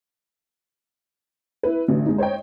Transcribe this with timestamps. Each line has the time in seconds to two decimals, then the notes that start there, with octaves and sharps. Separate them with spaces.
1.63 E4 B4
1.88 A1 D3 F#3
2.06 G#3 D#4
2.18 C5 C#5 D#5 G5